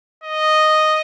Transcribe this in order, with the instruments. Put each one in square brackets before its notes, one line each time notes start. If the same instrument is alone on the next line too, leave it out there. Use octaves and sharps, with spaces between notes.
[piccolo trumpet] D#5